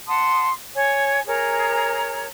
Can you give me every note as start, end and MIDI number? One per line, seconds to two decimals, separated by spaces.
0.08 0.49 78
0.08 0.49 81
0.08 0.49 84
0.08 0.49 87
0.75 1.21 73
0.75 1.21 80
1.27 2.26 68
1.27 2.26 70
1.27 2.26 73
1.27 2.26 82